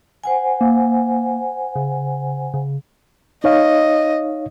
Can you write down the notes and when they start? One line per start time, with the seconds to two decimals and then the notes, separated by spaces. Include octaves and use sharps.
0.24 C5 F#5 G#5
0.61 A#3
1.75 C#3
2.54 C#3
3.44 D#4 C#5 D#5 F5